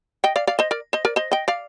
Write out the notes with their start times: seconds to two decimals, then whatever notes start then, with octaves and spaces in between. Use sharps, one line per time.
0.24 D#5 G5
0.36 D5 F5
0.47 D5 F5
0.59 C5 D#5
0.71 A#4 D5
0.93 C5 D#5
1.05 A#4 D5
1.16 C5 D#5
1.32 D#5 G5
1.48 D5 F5